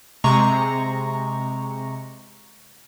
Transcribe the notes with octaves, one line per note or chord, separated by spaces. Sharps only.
C3 G#3 A#5 C#6